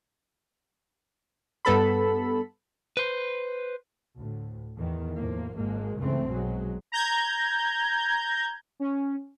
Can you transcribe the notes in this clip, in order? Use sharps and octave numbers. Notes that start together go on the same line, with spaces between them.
G2 B3 A4 B5
B4 C5
D2 A2
E2 D#3 E3
E2 A2 F3 A#3
G#1 G#2 G#3 A#3
C#2 G2 C#3 E3 A3 C4
B1 B2 F#3 G#3
A#5 G6 G#6
C#4